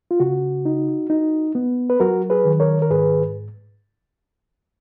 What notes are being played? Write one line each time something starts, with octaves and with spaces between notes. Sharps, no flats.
F4
C#3 F#4
D#4
D#4
B3
B4
F#3 F#4 A#4
G#4 B4
D#3
A#4 C#5
A#4
G#2 G#4 B4